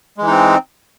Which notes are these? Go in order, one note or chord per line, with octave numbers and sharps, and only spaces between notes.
E3 G#3 C4 D#4